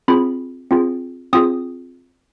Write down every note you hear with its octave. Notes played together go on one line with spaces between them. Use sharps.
C4 F4 G#4 B5
C4 F4 G#4
C4 F4 G#4 D#6